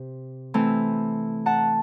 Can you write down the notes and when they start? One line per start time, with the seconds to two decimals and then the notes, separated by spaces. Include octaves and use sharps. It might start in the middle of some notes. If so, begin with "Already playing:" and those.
Already playing: C3
0.54 E3 A3 C4
1.46 F#5 A5